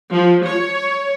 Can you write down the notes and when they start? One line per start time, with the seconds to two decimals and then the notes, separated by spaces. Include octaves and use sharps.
0.12 F3
0.47 C#5